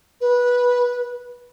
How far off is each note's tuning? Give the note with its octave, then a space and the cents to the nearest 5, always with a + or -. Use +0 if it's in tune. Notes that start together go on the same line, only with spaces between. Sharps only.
B4 -15